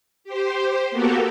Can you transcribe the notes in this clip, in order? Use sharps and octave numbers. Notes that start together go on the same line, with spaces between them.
G4 C5
A#3 B3 F#4 G4 A4 A#4